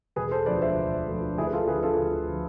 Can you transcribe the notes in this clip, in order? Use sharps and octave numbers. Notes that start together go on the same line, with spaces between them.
E1 G#4 B4
A4 C5
D2 D3 F3 B4 D5
C5 E5
E1
D2 D3 F3
D2 E4 G#4
B4
F4 A4
D3 F3 G#4 B4
F4 A4
D2
D3 F3